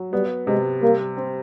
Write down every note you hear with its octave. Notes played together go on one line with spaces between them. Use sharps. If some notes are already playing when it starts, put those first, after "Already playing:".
Already playing: F#3
G3 B3
C3 G#3
G3 A#3
C4